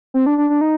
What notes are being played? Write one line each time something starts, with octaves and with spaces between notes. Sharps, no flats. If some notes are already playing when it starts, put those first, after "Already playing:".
C4
D4
D4
D4
D#4